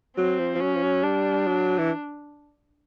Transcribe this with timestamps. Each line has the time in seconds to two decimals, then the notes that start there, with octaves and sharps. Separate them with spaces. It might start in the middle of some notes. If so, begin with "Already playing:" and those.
0.17 F#3 C4
0.39 F3
0.55 F3
0.60 F#3 C#4
0.75 F3
0.83 F#3
1.04 G3 D4
1.47 F#3
1.78 E3